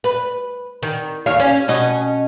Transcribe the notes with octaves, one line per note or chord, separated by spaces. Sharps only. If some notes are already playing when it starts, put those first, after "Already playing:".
B4
D#3
D#2 C#5 F5
C#4
B2 C#4 D#5